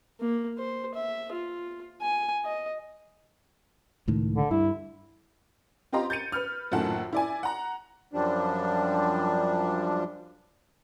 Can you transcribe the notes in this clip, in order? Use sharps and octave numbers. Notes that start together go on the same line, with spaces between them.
A#3
C5
E5
F4
G#5
D#5
C#2 A2 D#3
D3
G2 E4
C4 F4 G4 D#5 A#5 C6
G6 A6 C#7 D#7
B4 F6
A#1 F#2 A2 D#3 F#5 A5
E4 D5 G#5
F#5 A#5
F#2 F3 G3 D4